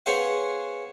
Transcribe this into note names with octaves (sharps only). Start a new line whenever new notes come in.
B3 C#4 G#4 C5 F5 F#5